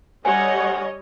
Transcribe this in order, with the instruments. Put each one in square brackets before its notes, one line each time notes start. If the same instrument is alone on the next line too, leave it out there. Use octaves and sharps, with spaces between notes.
[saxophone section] D2 F#5 [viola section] G3 C#5 D#5 [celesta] G#5